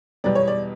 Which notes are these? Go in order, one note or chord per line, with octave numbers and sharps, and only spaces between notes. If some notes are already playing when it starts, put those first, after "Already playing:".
E2 B2 G3 D5
C#5
D5